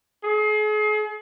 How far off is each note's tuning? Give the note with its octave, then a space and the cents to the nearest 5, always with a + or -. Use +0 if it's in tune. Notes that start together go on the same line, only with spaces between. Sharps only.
G#4 +40